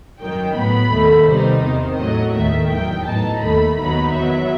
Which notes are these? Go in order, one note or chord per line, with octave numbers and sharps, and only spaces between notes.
F#2 D#3 F#3 G5
A2 F#3 B3 B5
D#2 D#3 A3
C3 D#3 G3 B3 D#4 C5
E2 C3 D#3 C5
A2 F#3 A3 D#5
D#2 D#3 A3 E5
E2 D#3 F#3 G5
A2 F#3 B3 D#4 A5
D#2 D#3 A3 B5
D#2 D#3 F#3 B3 D#4 B5
E2 D#3 F#3 B3 E5